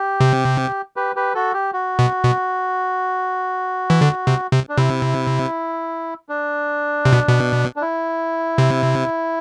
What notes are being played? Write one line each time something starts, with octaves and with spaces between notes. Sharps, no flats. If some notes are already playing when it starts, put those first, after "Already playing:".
Already playing: G4
C3
G4 B4
G4 B4
F#4 A4
G4
F#4
B2
B2
E3
D3
C3
C3
D4
C3 E4
D4
C3
B2
B2
D4
E4
C3